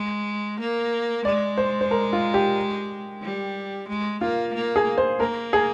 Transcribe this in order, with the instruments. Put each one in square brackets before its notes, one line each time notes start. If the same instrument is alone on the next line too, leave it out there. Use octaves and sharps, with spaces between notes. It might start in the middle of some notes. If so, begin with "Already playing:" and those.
Already playing: [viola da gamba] G#3
A#3
[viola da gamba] G#3 [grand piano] D5
[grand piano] C5
C5
A#4
F4
G4
[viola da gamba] G3
G#3
[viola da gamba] A#3 [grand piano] F4
[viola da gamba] A#3
[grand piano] G#4
C5
[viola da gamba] A#3 [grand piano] A#4
[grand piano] G#4